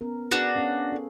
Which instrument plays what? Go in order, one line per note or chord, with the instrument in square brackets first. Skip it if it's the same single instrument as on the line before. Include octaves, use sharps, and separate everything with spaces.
[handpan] B3 C#4 A#4
[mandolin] D4 F#4 [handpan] G#4 B4
[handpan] B3 C#4 F5
A4